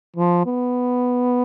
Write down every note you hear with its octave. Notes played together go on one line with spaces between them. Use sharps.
F3
B3